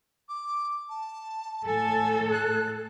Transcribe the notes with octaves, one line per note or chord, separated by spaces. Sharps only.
D6
A5
A2 A4 G#5
F#6